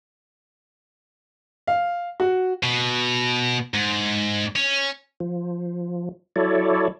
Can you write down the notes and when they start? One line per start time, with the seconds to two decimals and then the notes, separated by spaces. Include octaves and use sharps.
1.67 F5
2.20 F#4
2.63 B2
3.74 G#2
4.56 C#4
5.20 F3
6.36 F#3 E4 A4 C#5 D5